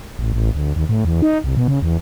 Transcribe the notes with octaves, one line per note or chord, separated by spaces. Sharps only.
A1
A1
D2
D#2
A2
E2
D#4
C2
B2
C#3
E2